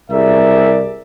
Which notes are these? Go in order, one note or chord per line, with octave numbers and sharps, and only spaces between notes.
C2 G#4 A#4 D5 E5